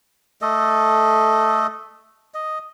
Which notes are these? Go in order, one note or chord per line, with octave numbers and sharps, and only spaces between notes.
A3 A4 D#5
D#5